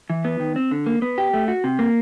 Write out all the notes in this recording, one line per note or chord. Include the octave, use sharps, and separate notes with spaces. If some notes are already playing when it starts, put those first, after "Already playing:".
E3
B3
D#3
C4
D3
A#3
B3
G4
A3
F#4
C3
A#3